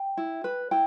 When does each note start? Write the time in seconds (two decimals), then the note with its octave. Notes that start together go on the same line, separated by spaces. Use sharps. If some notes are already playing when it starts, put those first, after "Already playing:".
Already playing: G5
0.17 E4
0.44 B4
0.71 E4 G5